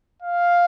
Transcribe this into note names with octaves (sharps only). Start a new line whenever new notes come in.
F5